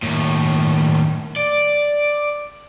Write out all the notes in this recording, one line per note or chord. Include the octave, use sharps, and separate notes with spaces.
D#2 A2
D5